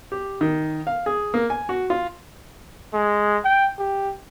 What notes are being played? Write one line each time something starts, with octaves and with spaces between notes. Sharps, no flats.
G4
D#3
F5
G#4
A#3
G#5
F#4
F4
G#3
G5
G4